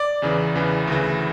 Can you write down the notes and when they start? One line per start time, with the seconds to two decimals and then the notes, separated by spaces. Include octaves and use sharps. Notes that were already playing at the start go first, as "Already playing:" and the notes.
Already playing: D5
0.22 E2 C#3 E3
0.55 E2 C#3 E3
0.87 D2 C#3 E3